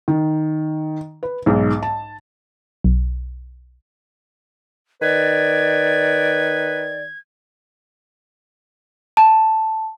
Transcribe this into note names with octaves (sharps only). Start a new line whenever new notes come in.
D#3
B4
B1 G#2
A5
B1
D#3 B4 D5 G#6
A5